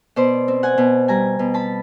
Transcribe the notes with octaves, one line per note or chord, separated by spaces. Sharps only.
B2 C5 D5
C4
F#5 G#5
B2
G3 G#5 A#5
B2
A5 B5